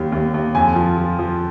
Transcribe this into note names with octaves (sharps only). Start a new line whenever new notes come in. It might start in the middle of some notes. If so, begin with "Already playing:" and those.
Already playing: D#2 G3
D#2
D#2
F2 G#5
F3
F3
F3